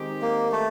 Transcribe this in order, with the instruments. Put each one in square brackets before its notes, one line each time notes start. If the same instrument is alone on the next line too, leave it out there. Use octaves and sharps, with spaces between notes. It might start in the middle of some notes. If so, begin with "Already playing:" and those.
Already playing: [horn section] D#3 G#3 C4 D#4 G4
[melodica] A#3
A3